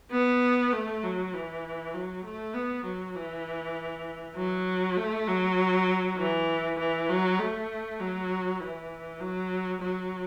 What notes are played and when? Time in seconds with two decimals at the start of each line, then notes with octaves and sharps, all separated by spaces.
0.12 B3
0.72 A3
1.03 F#3
1.34 E3
1.93 F#3
2.24 A3
2.54 B3
2.85 F#3
3.15 E3
4.36 F#3
4.97 A3
5.28 F#3
6.17 E3
6.79 E3
7.09 F#3
7.39 A3
8.00 F#3
8.60 E3
9.20 F#3
9.81 F#3